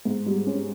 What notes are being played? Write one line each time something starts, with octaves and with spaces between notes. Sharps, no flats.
G#2
G3
C#4